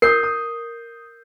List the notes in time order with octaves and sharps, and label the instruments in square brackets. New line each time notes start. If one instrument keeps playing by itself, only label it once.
[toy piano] A#4 [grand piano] D#6 G6 C7
[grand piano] D#6